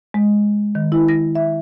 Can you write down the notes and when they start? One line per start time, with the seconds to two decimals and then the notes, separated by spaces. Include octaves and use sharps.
0.14 G#3
0.75 D#3
0.92 E4
1.09 A#6
1.35 E5